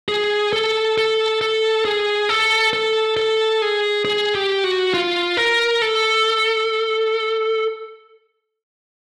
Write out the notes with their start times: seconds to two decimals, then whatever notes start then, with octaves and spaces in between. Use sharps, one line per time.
0.08 G#4
0.53 A4
0.98 A4
1.41 A4
1.85 G#4
2.29 A4
2.73 A4
3.17 A4
3.62 G#4
4.05 G#4
4.35 G4
4.64 F#4
4.94 F4
5.37 A#4
5.82 A4